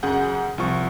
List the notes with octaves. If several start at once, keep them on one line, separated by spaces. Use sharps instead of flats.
F#2 C#3 G#4 F#5 G6
C2 F3 C#6